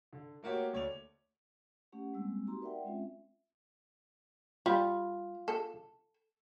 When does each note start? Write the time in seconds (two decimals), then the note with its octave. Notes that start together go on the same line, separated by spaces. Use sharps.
0.13 D3
0.43 A3 A#3 F#4 G4 C#5
0.73 D2 C#5 D5 F7
1.92 A3 C#4 G4 F#5
2.13 G3 G#3 A#3 C4 E6
2.47 B3 D#4 F#4 G4 A#5 C6
2.61 A#4 B4 D5 E5 F#5 G5
2.84 G#3 C4 C#4 F4 E5
4.66 G3 F4
5.48 A4